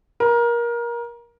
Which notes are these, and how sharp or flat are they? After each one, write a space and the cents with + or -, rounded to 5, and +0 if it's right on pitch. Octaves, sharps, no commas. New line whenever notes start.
A#4 +25